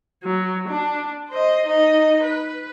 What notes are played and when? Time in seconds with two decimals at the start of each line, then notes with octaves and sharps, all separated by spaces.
0.24 F#3
0.69 D4
1.29 C5 D#5
1.67 D#4 D#5
2.23 B4